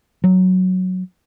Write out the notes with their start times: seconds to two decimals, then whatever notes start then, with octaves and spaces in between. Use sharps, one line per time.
0.24 F#3